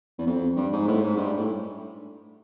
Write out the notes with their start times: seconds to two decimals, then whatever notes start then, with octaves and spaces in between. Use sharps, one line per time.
0.19 E2
0.27 F2
0.57 G2
0.73 G#2
0.88 A2
1.02 G#2
1.17 G2
1.37 A2